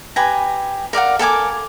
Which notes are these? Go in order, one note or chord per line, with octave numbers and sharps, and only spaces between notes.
G4 B4 G#5 A#5
A#4 D5 F5 F#5
A4 A#4 G#5 D6